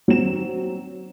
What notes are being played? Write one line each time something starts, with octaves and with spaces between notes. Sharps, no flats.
F#3 C4 E7